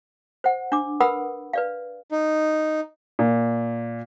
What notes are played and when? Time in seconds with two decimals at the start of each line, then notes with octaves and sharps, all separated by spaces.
0.44 C5 F#5
0.72 D4 D6
1.00 A#4 B4 F#5 B5 D#6 E6
1.53 B4 D5 F5
2.11 D#4
3.19 A#2